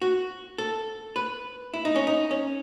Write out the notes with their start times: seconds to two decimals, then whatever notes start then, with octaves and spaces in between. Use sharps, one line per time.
0.02 F#4
0.58 A4
1.16 B4
1.74 E4
1.85 D#4
1.96 C#4
2.07 D#4
2.31 C#4